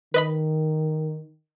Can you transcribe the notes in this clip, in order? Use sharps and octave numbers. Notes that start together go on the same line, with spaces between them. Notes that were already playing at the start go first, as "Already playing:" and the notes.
D#3 B4 D#5 B5